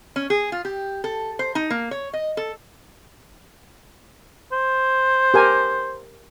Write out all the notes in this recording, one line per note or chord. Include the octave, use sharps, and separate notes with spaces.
C#4
G#4
F4
G4
A4
C5
D#4
A#3
C#5
D#5
A4
C5
G4 A#4 G#5